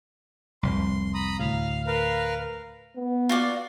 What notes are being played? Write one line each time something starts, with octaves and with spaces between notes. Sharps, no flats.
F1 C2 C6
A#5 B5 D#6
D2 A2 F5
A#4 B4 F5
B3
F4 F#4 D5